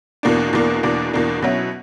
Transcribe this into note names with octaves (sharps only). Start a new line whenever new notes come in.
E2 B2 A#3 D4
E2 B2 A#3 D4
E2 B2 A#3 D4
E2 B2 A#3 D4
B2 F#3 C#4 E4